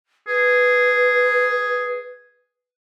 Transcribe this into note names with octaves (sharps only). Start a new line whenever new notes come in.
G#4 B4